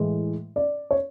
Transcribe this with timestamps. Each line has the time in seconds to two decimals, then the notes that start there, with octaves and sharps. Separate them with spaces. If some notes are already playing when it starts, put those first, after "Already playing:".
Already playing: A2 E3 G#3
0.56 D5
0.91 C#5